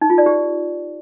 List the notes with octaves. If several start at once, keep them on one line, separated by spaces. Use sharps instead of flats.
D#4
F4
D5
G4